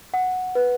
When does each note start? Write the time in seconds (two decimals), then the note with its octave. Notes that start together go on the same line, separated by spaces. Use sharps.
0.14 F#5
0.55 B4